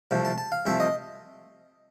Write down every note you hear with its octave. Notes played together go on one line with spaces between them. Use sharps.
C2 C3 F3 A3
A5
A5
F5
C2 C3 F3 A3 E5
D#5